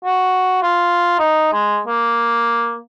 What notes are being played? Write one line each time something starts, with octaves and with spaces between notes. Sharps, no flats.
F#4
F4
D#4
G#3
A#3